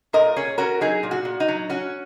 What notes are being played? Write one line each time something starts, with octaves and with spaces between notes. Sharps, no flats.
A#2 A#4 D#5
C#4 G#4 C#5
C#4 F#4 A#4
F#3 D#4 G#4
A#2
F#4
A#2
D#4
F#3
C#4 F#4